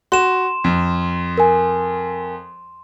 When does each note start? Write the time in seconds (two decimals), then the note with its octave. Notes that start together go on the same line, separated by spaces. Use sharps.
0.12 F#4 C6 E7
0.64 F2
1.38 A#4 G#5